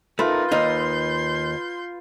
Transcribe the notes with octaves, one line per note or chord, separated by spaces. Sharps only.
A3 D#4 F4 A#4 B4
D#2 D#4 C6 G6